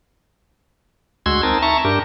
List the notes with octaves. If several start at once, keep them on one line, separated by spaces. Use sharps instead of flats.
D2 G#3 F#4 C6 E6 G#6
C4 D#4 A#4 A5
E5 A5 A#5 C#6
G2 D4 G4 A#4